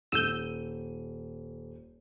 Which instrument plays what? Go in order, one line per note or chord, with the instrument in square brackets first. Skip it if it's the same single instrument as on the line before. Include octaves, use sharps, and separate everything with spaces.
[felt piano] D#1 D#7 [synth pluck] E6 G6